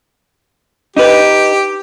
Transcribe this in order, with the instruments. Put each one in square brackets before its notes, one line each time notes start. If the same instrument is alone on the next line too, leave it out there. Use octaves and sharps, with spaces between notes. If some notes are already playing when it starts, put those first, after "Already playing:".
[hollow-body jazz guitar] D#4 B4 [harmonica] G4